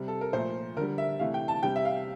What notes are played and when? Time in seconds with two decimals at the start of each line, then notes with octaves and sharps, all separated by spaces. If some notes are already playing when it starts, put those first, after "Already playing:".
Already playing: C3 G3
0.08 A4
0.21 A#4
0.33 A#2 F3 A3 C5
0.77 D3 A#4
0.81 G3
0.98 E5
1.19 C3 E3 A3 F5
1.34 G5
1.48 A5
1.63 C3 G3 G5
1.76 E5
1.85 F5